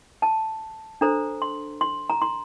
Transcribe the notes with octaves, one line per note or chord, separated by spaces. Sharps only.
A5
D4 A4 C5 A#5
C6
C6
A#5
C6